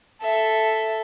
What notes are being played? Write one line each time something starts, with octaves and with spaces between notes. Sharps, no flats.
A4 E5